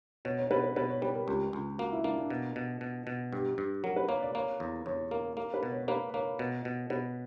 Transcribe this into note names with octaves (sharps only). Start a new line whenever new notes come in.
B2 C#5
C#5
B2 B4
B4
B2 B4
C#5
G3 B4
A#4
C#2 G4
C#2
A#3 F#4
E4
A#3 D4
D4
B2
B2
B2
B2
G2 G4
G2
F#3 A#4
B4
A#3 C#5
D5
A#3 C#5
E2
E2 C#5
A#3 A#4
A#3 A#4
B4
B2
C#5
C#5
A#3 B4
A#3 C#5
B2
B2
B2 B4